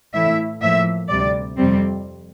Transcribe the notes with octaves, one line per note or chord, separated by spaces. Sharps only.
A2 E3 A3 E4 E5
A2 F3 A#3 E5
D2 C3 G3 D5
F2 C3 G3 C4